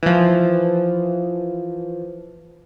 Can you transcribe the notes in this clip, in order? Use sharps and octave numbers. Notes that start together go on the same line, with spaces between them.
E3 F3